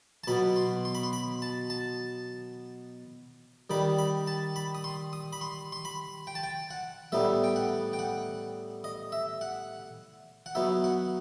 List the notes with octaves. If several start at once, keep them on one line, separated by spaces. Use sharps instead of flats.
A5
B2 F#3 B3 B5
C6
C6
B5
C6
B5
A5
A5
D#3 G3 D#4 B5
B5
A5
B5
D#6
C6
D#6
B5
C6
C6
B5
G5
A5
G5
F#5
A2 G3 B3 D#4 E5
G5
F#5
G5
F#5
D#5
E5
F#5
F#5
F#3 B3 D#4 E5
F#5